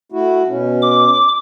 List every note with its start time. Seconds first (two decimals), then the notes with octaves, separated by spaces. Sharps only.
0.12 A3 E4 F#4
0.48 B2 C#4
0.82 D6